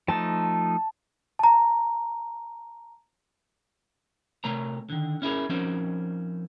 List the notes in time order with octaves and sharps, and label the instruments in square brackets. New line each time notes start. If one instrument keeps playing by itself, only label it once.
[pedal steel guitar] F3 A3 D#4 [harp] A5
[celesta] A5 A#5
[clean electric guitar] C3 A3 A#4 C#5 A#5
D3 D#3
C#4 E4 G#4 A#4
F3 C4 C#4 D#4 A#4 C5